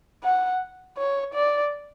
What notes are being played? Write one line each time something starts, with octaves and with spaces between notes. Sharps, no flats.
F#5
C#5
D5